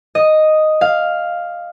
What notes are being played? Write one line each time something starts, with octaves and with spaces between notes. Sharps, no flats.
D#5
F5